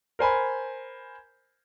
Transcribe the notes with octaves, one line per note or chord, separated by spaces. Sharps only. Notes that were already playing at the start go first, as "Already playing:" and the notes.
A#4 C5 G#5 B5